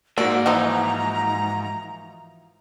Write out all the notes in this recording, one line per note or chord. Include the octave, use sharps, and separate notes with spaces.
G#2 A#3 F#4 D5 E6
E3 F3 D#4 A#5